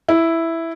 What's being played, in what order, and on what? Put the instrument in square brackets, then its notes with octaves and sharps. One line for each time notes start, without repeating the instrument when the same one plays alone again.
[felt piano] E4